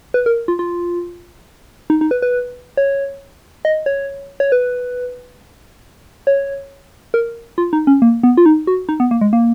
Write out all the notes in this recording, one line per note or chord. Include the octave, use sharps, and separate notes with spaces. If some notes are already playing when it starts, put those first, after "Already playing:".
B4
A#4
F4
F4
D#4
D#4
B4
B4
C#5
D#5
C#5
C#5
B4
C#5
A#4
F4
D#4
C#4
A#3
B3
F4
D#4
F#4
D#4
B3
A#3
G#3
A#3